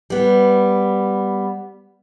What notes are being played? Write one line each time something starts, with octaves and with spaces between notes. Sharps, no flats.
G3 B3